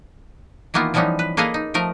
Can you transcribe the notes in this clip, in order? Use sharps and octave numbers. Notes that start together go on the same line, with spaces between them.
D#3 E3 A#3 B3 F4
E3 F3 G3 B3 C#4 D#4
B4
A#3 G#4 A4 B4 D#5 F5
D#4
F3 A3 A#4 D#5